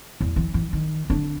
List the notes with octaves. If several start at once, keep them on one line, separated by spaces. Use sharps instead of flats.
E2
E3
E3
D#3
D3 D4